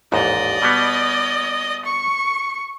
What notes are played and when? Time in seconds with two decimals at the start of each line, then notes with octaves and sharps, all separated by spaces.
0.12 A1 D#2 G#2 D5 D#5
0.62 B2 G3 B3
1.85 C#6